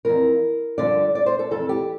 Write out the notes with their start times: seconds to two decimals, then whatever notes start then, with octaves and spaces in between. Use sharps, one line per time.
0.05 F2 E3 A#4
0.78 G2 D3 F3 D5
1.15 D5
1.26 C5
1.39 A4
1.51 F2 E3 A4
1.69 G4